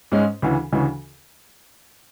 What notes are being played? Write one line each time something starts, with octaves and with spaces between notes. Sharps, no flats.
G#2 G#3 C#4
D2 C#3 E3
D2 C#3 E3